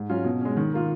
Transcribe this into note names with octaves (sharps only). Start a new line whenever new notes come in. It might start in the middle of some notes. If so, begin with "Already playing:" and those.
Already playing: G#2
F#3 C#4 F4
B2
G#3 C#4
D#3
A#3 F4